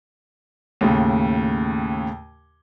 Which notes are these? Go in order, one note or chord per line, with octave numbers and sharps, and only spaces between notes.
D#2 A2 C#3